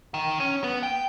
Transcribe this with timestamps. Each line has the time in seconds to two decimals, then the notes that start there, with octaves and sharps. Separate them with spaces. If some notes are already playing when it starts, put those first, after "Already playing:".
0.14 D#3
0.40 C#4
0.64 B3
0.83 G5